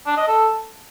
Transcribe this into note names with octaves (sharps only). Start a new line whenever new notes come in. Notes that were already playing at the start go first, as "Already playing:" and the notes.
D4
D#5
A4